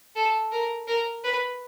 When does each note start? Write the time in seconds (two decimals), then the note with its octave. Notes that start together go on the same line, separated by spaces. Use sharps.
0.16 A4
0.52 A#4
0.87 A#4
1.24 B4